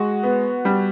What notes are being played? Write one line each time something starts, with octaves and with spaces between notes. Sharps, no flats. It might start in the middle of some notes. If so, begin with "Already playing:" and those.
Already playing: G#3 F#4
B3
G3